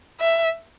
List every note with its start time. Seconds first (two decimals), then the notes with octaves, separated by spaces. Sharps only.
0.21 E5